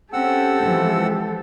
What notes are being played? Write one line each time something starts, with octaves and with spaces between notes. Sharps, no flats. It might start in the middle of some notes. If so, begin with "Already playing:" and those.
C4 C#4 G4 A4 F#5 E6
E3 F3 G#3